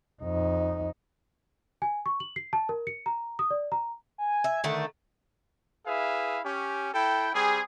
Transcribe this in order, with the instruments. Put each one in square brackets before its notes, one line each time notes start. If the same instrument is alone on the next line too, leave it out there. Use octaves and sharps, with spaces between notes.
[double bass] F2 D#4
[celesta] G#5
C#6
F#7
C7
A5
A#4
C#7
A#5
D#6
D5
A#5
[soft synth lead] G#5
[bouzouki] E5
D3 D#3 A3
[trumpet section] E4 G#4 B4 E5 F5
C#4 G4
E4 A4 G5
G3 C4 G#4